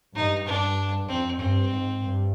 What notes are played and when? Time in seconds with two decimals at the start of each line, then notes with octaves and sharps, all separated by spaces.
0.15 G2 D#4
0.47 G2 D4
1.08 F2 C4
1.39 G2 C4
1.71 G#2
2.03 G2